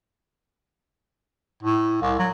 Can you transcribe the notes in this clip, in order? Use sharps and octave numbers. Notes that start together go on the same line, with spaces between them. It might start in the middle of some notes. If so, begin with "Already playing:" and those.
A2
C2
F#3